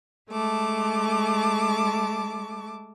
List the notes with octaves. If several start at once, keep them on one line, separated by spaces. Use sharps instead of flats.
G#3 A3 A5 D6